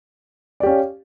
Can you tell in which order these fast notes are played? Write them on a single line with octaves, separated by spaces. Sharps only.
D5 G4 C#4 F5